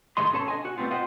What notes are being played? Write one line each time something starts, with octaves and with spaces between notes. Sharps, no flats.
G#2 D#3 G#3 A3 D#5 C6
C#4 A4 A5 A#5 C6
D4 D#5 G#5
F#4
G3 A3 B3 C4 F4
F4 C5 D#5 F#5 G5